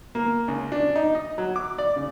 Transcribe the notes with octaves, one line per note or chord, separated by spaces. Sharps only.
A#3
C#2
D4
D#4
D#5
F#3
D6
D5
C#3